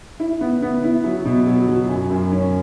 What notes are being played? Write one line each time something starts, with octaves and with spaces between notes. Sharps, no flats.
E4
B3
B3
E4
F#3
B2
F#3
F#3
F#2
F#2
C#4